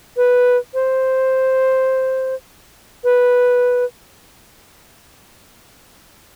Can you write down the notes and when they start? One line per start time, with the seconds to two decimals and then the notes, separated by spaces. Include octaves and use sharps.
0.17 B4
0.74 C5
3.04 B4